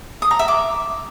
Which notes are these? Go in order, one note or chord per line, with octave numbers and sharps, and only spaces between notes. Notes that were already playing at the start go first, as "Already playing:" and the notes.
D#6
A#5
E5
D6